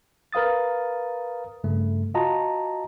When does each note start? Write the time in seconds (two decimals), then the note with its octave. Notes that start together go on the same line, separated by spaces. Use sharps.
0.33 A#4 B4 F5 D#6 A6
1.64 G2 C#3 A3
2.14 F4 F#4 D#5 A5 A#5